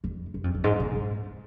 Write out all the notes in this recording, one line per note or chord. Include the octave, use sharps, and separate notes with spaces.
F2
F#2
F2
F#2
G#2
A#2
G#2